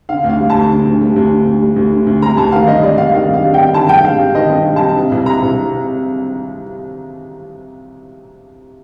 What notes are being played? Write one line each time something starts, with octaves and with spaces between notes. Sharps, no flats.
D3 F5
D2
F5
G3
A5
D2
D3
D2
G3
D2
D3
D2
G3
D2
D3
D2
G3 A#5
D2 A5
D#3 F5
G2 D#5
G3 D5
G2 F5
D#3 F5
G2
F5
G3
G5
G2
D#3 A5
G2 G5
G3 F5
G2
D#3 D#5
G2
G3
A5
G2
C3
C2
G3 A#5
C2